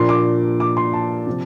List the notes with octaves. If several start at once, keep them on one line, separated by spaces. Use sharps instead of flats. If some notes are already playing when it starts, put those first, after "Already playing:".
Already playing: A#2 F3 A#3 D4 C6
D6
D6
C6
A5
C3 F3 C4